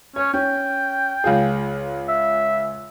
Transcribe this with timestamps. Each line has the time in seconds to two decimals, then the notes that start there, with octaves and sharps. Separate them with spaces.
0.16 C#4 C#5
0.34 C#4 G5
1.24 C#2 F4 G#4
2.08 E5